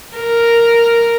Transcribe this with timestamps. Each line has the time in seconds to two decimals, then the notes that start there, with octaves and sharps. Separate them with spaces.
0.16 A#4